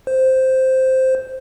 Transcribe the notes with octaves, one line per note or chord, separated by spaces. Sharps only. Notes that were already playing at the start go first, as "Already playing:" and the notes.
C5